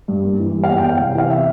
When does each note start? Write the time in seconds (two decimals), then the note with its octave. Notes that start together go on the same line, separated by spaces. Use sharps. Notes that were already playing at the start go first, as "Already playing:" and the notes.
0.08 G2
0.24 A#3
0.39 E3
0.54 G3
0.64 F5
0.68 E2 F#5
0.79 G5
0.84 E2
0.89 F5
1.00 C3
1.14 E3 F5
1.30 E5